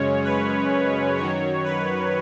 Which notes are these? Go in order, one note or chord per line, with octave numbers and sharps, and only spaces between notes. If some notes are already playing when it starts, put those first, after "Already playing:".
Already playing: F#2 C#3 G#3 C#4 C#5
B4
F#2 D#3 F#3 C#5
B4